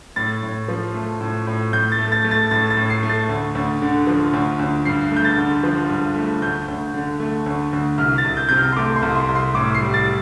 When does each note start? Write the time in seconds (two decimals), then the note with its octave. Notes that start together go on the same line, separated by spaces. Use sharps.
0.16 A2 A6
0.43 A2
0.68 F3
0.94 A3
1.21 A2
1.47 A2
1.73 A2 G6
1.92 A6
1.98 A3
2.12 A6
2.24 A3
2.31 A6
2.51 A2 A6
2.70 A6
2.77 A2
2.90 C7
3.03 A3
3.09 A6
3.29 D2
3.55 D2
3.82 D3
4.07 F3
4.33 D2
4.59 D2
4.85 G2 C7
5.11 A3
5.17 G6
5.25 A6
5.38 D3
5.63 F3
5.90 G2
6.16 A3
6.42 D2 G6
6.68 D2
6.94 D3
7.20 A3
7.46 D2
7.73 D2
7.98 C2 F6
8.18 A6
8.24 C2
8.37 G6
8.49 C3 G6
8.57 F6
8.72 C6
8.76 A3 D6
8.96 C6
9.02 C2
9.16 C6
9.28 C2
9.35 C6
9.54 A2 D6
9.75 C7
9.81 G3
9.94 A6